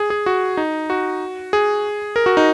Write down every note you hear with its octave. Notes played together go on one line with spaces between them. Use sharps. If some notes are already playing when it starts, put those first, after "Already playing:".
Already playing: G#4
G#4
F#4
D#4
F#4
G#4
A#4
F#4
D#4